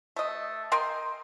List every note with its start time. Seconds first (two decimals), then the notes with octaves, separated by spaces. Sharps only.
0.16 A3 D#5
0.72 A#4 D#5 G5 C6